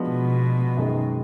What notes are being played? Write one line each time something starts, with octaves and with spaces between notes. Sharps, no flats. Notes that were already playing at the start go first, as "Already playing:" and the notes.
Already playing: F3 G#3 B3 D4 F#4
B2
F#2 D#3 G#3